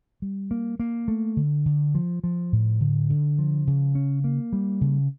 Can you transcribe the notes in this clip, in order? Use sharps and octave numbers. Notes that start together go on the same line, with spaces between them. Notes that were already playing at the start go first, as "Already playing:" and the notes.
G3
A#3
A#3
A3
D3
D3
F3
F3
A2
D3
D3
F3
C#3
C#4
A#3
G3
C#3